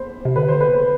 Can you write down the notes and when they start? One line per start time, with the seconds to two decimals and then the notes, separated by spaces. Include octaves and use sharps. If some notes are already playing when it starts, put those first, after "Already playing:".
Already playing: C5 B5
0.25 C3
0.36 D3 B4
0.48 C5
0.60 B4
0.74 C5